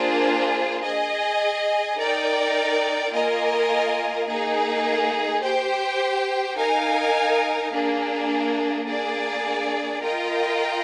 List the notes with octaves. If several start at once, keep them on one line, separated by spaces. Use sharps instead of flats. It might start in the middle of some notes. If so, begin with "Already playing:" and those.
Already playing: A#3 D4 F4 G#4 C5
G#4 D#5 G#5
D#4 A#4 D5 G5
A#3 F4 A#4 D#5 G#5
A#3 D#4 G#4
G4 C5 G5
D#4 A#4 F5 G#5
A#3 D4 G#4
A#3 D4 G#4 D5
F4 A#4 D#5 G5